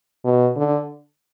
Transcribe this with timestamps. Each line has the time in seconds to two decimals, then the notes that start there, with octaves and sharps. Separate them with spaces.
0.25 B2
0.57 D3